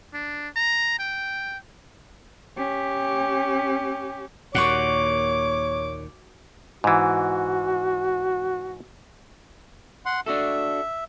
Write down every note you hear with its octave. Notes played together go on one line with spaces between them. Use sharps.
D4
A#5
G5
C#4 G4
D#2 A#2 F#4 C#5 F#5 C#6 D6
G#2 E3 F#4
F#5 C6
D4 F#4 A4 E5